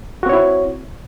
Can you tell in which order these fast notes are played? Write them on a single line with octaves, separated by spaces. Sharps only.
F#4 C4 C#5 E4